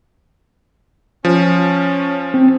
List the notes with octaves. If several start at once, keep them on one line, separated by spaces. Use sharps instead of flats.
F3 C#4
C4